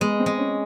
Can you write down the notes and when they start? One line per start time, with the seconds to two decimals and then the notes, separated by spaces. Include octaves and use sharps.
0.01 G#3 B3
0.19 C4
0.26 G#3
0.38 C#4